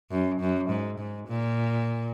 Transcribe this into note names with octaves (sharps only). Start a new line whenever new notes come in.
F#2
F#2
G#2
G#2
A#2